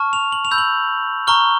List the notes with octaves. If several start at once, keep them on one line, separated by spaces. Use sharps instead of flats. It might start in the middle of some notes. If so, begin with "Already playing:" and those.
Already playing: A5 C#6 F6
F7
F#7
F7
B5 E6 G6
F#7
A#5 C#6 F6 G7